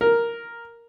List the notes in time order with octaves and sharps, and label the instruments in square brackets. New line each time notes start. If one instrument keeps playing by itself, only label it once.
[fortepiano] A#4